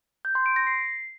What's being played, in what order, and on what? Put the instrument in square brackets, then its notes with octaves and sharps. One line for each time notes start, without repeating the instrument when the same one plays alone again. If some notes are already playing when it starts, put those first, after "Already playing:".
[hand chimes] G6
C6
D7
A#6
C7